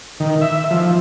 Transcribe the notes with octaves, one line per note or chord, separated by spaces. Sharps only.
D#3
E5
F3